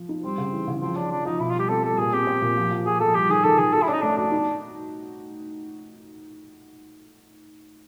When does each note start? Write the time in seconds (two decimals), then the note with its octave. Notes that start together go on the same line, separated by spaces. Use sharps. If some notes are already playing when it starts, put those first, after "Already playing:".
Already playing: F3
0.09 D#4
0.23 G3 C4
0.38 C#3
0.53 E3
0.68 C#3
0.81 F3 C4
0.96 C#4 D4
1.11 F3 D4
1.25 F3 D#4
1.40 B2 E4
1.50 F4
1.55 G3 G4
1.69 C4 A4
1.84 G3 A4
1.98 A#2 G#4
2.13 C4 G4
2.27 C4
2.42 A#2
2.57 F3
2.71 F3
2.85 F3 G#4
3.00 F3 A4
3.15 G3 G4
3.30 D#3 G#4
3.44 D#3 A4
3.59 D#3 G#4
3.73 F#4 A4
3.83 E4
3.87 C#4 D4
3.93 D#4
4.02 A3 D4
4.17 D4 F#4
4.32 D#4